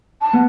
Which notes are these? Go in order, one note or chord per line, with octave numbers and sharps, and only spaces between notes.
A5
B3